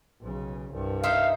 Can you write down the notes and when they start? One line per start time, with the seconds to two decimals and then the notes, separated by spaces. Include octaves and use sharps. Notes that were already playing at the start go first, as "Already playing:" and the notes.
0.21 B1 C#3
0.71 C2 G2
1.04 D#4 C5 E5 F5